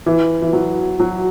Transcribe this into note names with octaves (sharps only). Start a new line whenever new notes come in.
E3
E3
F#3
F#3